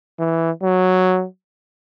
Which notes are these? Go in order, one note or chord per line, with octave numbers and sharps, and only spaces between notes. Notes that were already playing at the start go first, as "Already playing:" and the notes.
E3
F#3